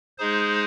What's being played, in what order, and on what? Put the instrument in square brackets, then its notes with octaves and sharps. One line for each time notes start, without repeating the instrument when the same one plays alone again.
[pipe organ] G#3 D#4 G#4 C5